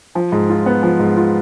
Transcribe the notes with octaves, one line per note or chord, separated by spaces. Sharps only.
F3
G#2
F4
B3
F3
G#2
F4